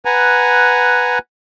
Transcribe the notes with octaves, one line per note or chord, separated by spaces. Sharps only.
B4 F#5 G#5 A#5